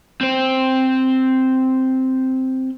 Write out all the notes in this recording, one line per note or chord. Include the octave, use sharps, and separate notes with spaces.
C4 C5